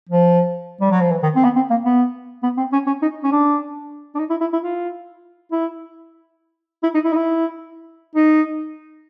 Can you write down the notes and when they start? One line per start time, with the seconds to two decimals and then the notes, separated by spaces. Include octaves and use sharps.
0.09 F3
0.81 G3
0.91 F#3
1.01 F3
1.11 E3
1.23 D#3
1.36 C4
1.44 B3
1.56 C4
1.70 A#3
1.85 B3
2.43 B3
2.57 C4
2.73 C#4
2.87 C#4
3.02 D#4
3.23 C#4
3.32 D4
4.15 D4
4.19 D#4
4.30 E4
4.41 E4
4.53 E4
4.63 F4
5.52 E4
6.83 E4
6.94 D#4
7.05 E4
7.12 D#4
7.16 E4
8.15 D#4